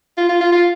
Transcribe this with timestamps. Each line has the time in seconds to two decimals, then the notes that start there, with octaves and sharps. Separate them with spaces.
0.18 F4
0.29 F4
0.41 F4
0.52 F4